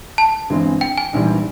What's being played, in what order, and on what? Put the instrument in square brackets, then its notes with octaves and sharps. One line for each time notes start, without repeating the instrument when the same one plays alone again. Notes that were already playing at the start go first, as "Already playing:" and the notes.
[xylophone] A5
[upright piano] G1 G2 E3 G#3 C4
[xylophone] G5
G#5
[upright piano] A#1 G#2 E3 G3